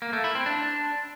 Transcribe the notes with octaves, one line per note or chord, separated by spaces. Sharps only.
A#3
A3
E4
C4
D4